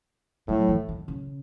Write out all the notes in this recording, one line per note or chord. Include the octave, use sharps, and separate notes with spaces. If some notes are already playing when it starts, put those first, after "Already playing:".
A2 F#3
E3
D#3
C#3